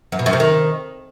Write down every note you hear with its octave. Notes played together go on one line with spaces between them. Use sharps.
F#2
B2
F#2
C3
D#3